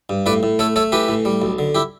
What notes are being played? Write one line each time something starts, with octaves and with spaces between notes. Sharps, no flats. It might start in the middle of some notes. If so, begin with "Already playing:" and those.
G2
A2 B4 D5
A2
A3 A4 C#5
A3 A4 C#5
E3 G4 B4
A2
G3
B1
D3
E4 G4